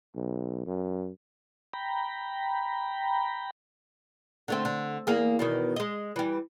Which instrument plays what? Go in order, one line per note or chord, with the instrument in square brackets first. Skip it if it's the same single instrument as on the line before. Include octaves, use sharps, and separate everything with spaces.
[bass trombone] B1
F#2
[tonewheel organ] G5 A#5 B5
[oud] D3 A3 C4
D3
E2 A#3 G#4
E2 B2 D#3
G#3 D#5
E3 G3